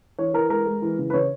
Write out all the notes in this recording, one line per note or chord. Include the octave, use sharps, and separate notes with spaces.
E3 C#5
E3 A#4
G#3 A#4
G#3
E3
C#3
B4
C#3 C#5